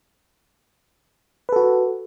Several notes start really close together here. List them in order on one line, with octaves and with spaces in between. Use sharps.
B4 A4 F#4